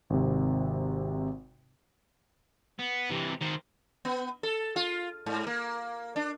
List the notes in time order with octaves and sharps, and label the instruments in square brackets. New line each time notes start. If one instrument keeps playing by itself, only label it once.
[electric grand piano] G#1 C3
[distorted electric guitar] B3
C3 E3
D#3 C5
[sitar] B3
A4
F4
G#2
A#3
D4